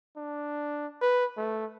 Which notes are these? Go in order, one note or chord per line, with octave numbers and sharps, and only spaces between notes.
D4
B4
A3